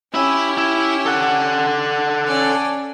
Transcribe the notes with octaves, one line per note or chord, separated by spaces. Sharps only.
C#4 E4 G4 E5
E4
A4 F#5
C#4 D5